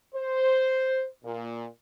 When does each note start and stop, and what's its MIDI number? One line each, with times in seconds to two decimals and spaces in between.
0.15 1.06 72
1.24 1.65 46